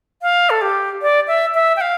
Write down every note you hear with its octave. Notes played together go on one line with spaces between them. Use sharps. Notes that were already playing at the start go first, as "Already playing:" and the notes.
F5
A4
G4
D5
E5
E5
G5
F5